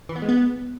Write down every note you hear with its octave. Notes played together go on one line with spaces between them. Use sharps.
E3
B3
G#3
B3